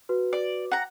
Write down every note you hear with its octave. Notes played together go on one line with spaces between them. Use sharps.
F#4 B4
D5
F#5 A#5